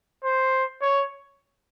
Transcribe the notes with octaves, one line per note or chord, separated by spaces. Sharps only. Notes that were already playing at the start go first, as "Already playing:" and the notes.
C5
C#5